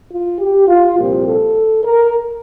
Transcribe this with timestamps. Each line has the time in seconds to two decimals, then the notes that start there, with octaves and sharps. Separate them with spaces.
0.11 F4
0.40 G4
0.68 F4
0.97 C2 A#2 F3 C4 G4
1.26 A4
1.84 A#4